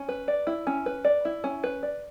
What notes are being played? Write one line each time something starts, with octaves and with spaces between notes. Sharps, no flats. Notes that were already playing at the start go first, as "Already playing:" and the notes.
Already playing: C#4
B4
D5
E4
C#4
B4
D5
E4
C#4
B4
D5